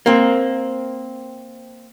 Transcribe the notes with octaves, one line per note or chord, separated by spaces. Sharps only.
A#3 C4